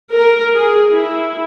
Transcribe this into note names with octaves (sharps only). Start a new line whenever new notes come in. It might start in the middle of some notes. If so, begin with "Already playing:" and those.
A#4
G#4
E4